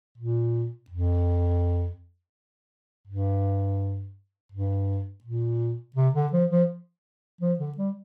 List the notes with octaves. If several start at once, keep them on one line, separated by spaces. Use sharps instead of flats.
A#2
F2
G2
G2
A#2
C3
D3
F3
F3
F3
D3
G3